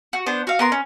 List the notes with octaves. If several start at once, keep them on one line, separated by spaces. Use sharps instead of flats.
F#4
B3 D4 C5
F#4 F5
B3 A#4 C6
C#4